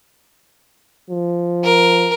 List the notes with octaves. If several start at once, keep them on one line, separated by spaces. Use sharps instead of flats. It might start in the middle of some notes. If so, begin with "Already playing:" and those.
F3
A#4